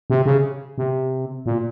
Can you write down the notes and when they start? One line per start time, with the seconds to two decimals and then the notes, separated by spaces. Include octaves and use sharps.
0.10 C3
0.26 C#3
0.78 C3
1.46 A#2